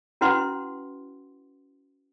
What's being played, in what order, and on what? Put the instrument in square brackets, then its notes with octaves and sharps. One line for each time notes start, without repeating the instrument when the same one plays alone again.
[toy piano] C#4 E4 F#4 B4 F#5 C6